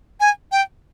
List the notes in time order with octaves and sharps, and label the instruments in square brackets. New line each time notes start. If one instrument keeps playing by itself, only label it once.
[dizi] G#5
G5